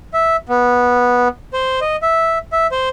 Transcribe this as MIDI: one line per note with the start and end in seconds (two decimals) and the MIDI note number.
0.14 0.36 76
0.49 1.28 59
1.53 1.80 72
1.81 1.96 75
2.02 2.38 76
2.52 2.67 76
2.72 2.89 72